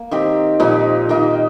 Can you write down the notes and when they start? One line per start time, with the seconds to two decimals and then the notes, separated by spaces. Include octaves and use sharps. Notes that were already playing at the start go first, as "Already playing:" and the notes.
Already playing: A#3
0.11 D#3 C4 D#4 G4
0.60 A#2 F3 D#4 G4
1.09 D#3 A#3 D#4 G4